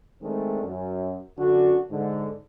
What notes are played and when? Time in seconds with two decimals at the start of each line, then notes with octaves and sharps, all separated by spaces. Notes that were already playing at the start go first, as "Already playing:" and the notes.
0.22 D#3 G#3 A3 C4 D4
0.62 F#2
1.38 F#2 D3 D4 F#4
1.90 G#2 D3